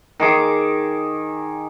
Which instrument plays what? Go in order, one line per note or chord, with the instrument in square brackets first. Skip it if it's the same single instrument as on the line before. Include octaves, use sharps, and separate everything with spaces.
[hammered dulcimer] D#3 G#4 D6